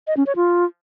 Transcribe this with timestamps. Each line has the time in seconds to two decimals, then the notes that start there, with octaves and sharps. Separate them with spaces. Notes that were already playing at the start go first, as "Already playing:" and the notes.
0.07 D#5
0.17 C#4
0.27 C#5
0.36 F4